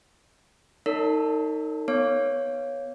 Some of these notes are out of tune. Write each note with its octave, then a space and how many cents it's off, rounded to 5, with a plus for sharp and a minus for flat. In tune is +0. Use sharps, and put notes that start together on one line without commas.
D#4 +0 A#4 -45 C#5 +35
B3 +0 C#5 +0 D6 -15